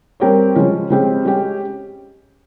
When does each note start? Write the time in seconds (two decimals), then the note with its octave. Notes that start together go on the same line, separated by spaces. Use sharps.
0.20 G3 C4 G4 A#4 C#5
0.55 C#3 F3 G#3 C#4
0.90 C#3 G#3 C4 G4
1.25 G#3 C#4 G4